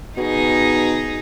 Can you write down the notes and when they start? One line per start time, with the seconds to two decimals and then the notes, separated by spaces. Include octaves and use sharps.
0.17 B2 D#4 G#4